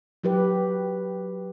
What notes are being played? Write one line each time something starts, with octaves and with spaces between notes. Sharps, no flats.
F#3 G4 B4